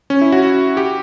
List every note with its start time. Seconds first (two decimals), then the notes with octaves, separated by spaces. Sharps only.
0.10 C#4
0.21 E4
0.32 F#4
0.77 G4